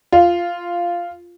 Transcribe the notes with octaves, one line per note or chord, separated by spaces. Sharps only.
F4